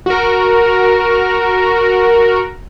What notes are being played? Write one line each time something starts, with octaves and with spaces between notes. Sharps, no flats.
F#4 A#4